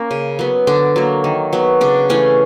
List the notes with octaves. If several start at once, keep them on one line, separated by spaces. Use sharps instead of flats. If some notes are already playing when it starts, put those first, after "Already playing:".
Already playing: A#3 C#4
C#3
F#3 B3
D3 D4
F#3 A#3
D#3
F#3 B3
C#3 D4
E3 A3 C#4